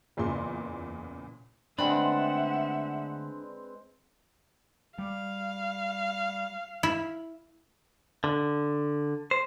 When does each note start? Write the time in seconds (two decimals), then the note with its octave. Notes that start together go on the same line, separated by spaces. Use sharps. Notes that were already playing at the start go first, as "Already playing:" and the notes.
0.17 F#1 E2 A#2 C#3 C6
1.78 D2 G#3 C4 D4 B4 E5 F#5 B5
4.98 G3 F5
6.83 E4
8.24 D3
9.31 C5